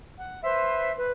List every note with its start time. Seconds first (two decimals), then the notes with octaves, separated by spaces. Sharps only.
0.17 F#5
0.43 B4 C5 E5 C6
0.98 B4